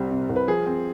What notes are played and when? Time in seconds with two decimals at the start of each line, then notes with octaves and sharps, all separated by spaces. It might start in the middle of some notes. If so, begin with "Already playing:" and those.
Already playing: C2 C3 G3 C4
0.11 C3
0.30 C2
0.36 B4
0.48 F3 G#4
0.66 C4